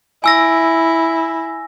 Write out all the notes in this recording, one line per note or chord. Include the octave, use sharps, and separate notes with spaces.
E4 G#5 E6 A#6